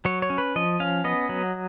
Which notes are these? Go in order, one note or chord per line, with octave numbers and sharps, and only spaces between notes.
F#3 C#5
C#5
C#4
B4
F3 D#5
C#4 F5
B3 D#5
F#3